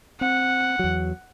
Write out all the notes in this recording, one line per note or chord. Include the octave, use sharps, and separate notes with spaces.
C4 F#5
E2 F#3